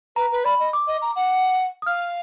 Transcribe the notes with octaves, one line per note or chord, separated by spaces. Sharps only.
B4 A#5
B4
D5 B5
D#5
D6
D#5
A#5
F#5
D#6
F5 F6